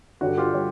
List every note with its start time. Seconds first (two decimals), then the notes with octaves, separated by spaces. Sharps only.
0.21 G2 D3 G3 F#4
0.38 F4 G4
0.55 G3